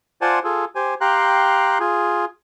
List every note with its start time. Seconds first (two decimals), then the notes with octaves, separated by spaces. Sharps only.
0.21 F4 C5 D5 F#5 G#5 A5
0.44 F4 G#4 A4
0.75 G4 C5 G#5
1.01 G4 F5 G5 A#5 C6 F#6
1.80 F4 G#4